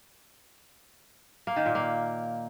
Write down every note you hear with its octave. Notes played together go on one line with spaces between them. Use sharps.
A#3
D#3
A#2
A#3